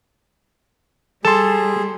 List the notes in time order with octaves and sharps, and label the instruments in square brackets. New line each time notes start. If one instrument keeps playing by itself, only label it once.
[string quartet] G3 [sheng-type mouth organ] G#4 [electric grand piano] A4 C6 [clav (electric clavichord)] A5